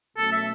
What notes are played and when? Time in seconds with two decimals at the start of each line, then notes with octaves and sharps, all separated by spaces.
0.17 B2 F#3 A3 C#4 A4
0.32 E5